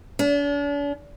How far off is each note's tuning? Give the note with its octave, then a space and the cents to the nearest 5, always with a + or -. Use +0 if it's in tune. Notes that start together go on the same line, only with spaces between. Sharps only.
D4 -45